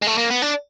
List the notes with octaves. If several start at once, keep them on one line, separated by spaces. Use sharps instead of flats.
G#3
A3
A#3
B3
D4